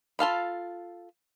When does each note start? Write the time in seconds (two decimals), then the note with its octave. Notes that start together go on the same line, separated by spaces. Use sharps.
0.19 F4 A4 F5 B5